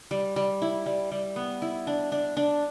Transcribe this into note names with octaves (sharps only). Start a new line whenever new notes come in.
G3
G3
E4
G3
G3
B3
E4
D4
D4
D4